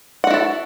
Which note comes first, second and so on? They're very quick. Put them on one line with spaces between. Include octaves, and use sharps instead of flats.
F#5 F#4 E4 A4